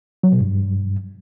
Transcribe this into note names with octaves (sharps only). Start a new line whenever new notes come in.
F#3
B2
G2